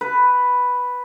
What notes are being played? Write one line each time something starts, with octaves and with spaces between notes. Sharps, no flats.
B4